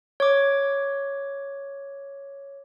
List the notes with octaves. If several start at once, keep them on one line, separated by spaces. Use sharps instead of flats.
C#5 D6